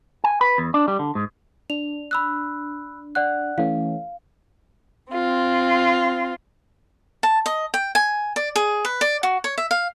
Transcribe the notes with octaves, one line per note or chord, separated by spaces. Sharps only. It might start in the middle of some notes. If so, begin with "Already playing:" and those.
G#5
B4
E2
D4
G3
D3
G#2
D4 F7
B5 E6 F#6
D5 F#5 F#6
E3 A3 C#4 F5
C4 F4
A5
D#5
G5
G#5
D5
G#4
B4
D5
F#4
C#5
E5
F5